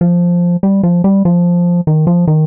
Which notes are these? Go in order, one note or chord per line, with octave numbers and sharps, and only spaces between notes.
F3
G3
F3
G3
F3
D#3
F3
D#3